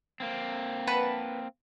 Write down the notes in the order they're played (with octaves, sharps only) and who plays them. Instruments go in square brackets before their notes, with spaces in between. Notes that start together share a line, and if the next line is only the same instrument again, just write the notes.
[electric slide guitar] A#3 C4
[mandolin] B4 F#5 A5